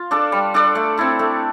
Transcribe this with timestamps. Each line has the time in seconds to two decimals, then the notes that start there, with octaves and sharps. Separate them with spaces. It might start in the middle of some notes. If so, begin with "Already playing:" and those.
Already playing: F4
0.11 D4 A4 D5
0.32 G3
0.54 D4 A4 D5
0.75 A3
0.98 C4 E4 A4
1.19 A3